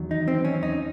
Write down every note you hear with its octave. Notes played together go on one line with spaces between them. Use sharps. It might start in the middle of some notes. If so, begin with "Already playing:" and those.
Already playing: E2 D#3 F#3
D#4
C4
C#4
D#4